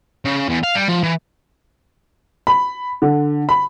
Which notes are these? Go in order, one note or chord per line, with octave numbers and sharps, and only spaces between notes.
C#3
E2
F5
G3
F3
E3
B5
D3
B5